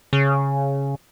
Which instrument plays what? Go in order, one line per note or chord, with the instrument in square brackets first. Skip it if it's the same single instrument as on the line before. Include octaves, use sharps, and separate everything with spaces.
[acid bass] C#3